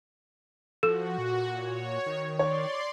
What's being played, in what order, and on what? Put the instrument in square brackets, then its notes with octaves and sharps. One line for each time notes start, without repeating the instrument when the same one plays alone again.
[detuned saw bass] F3 [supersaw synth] F#4 [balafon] A4
[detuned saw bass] A#2
[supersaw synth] C#5
[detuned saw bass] D#3
[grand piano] C#5 [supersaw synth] D5 C6